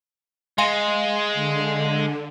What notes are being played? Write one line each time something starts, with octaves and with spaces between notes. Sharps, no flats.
G#3 F5 G#5 C6
D3